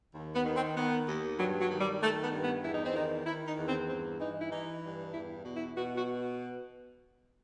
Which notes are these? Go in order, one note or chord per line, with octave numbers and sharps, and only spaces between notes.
D#2
B3
D#3
C4
D#3 B3
D#2
G2 F#3
F#3
D#3
G3
D#3 A3
B3
G2
B3
E2 E4
D#4
C4
D#3 D#4
D#3 E4
D#4
E2
C4
G2 C4
E3 D#4
E4
E3 D#4
G2
E2 E4
B2
E4
B2 F#4
F#4